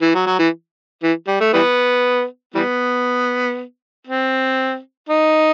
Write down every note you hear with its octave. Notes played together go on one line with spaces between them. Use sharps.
E3
F#3
F#3
E3
E3
G3
A3
E3 G3 B3
E3 G3 B3
C4
D#4